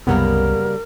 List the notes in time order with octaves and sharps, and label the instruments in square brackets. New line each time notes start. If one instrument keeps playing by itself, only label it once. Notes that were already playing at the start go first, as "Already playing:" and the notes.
[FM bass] C2 [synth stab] F#2 B3 [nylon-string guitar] C#3 G3 A#3 [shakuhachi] A#4